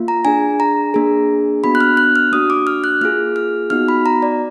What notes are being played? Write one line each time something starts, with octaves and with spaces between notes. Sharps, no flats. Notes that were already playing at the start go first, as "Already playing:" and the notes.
Already playing: A#3 F4
A#5
D4 G#4 G#5
A#5
A#3 D4 G#4
B3 D4 F#4 B5
F#6
F6
F#6
F6
A#3 D4 F#4 D#6
D6
F6
F#6
A#3 F4 G#4 F6
F6
B3 D#4 F#4 F6
B5
A#5
D5